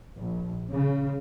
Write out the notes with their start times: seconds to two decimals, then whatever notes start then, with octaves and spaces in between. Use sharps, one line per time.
0.18 A#1
0.70 C#3